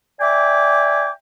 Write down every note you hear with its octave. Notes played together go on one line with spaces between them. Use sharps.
D5 E5 G5 G#5 D6